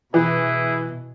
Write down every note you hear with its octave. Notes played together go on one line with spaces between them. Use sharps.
B2 E3 E4 G#4 B4